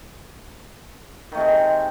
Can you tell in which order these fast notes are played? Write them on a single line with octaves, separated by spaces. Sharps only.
D#3 A3 C3 G#3